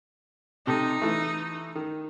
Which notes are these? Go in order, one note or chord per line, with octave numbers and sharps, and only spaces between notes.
C3 D#4 G4 A4
E3 A3
D#3